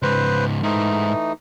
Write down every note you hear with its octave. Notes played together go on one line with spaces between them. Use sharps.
C#2 G#2 B4 C5
G#2 E3 A3 D#4